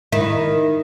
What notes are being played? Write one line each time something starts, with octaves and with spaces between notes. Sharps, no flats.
D#3 E4